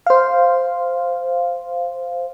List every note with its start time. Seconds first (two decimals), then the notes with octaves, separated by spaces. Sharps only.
0.06 C5 F5